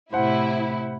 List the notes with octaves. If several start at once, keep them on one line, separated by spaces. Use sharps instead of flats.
A2 C3 E4 C5 F#5